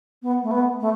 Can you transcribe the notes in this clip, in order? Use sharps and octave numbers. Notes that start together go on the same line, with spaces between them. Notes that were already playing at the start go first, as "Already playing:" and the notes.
B3
A3
B3
A3